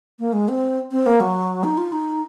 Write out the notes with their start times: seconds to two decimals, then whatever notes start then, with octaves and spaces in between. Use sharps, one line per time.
0.19 A#3
0.33 G#3
0.48 C4
0.91 C4
1.06 A#3
1.20 F#3
1.64 D#4
1.78 F4
1.92 D#4